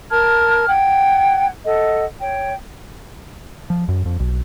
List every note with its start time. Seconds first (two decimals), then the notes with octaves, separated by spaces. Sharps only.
0.11 A#4 A5 F6 G#6
0.68 F#5 G5 G#6
1.65 A4 D#5 F#5
2.20 C#5 G5
3.70 F3
3.89 F#2
4.05 F2
4.20 B1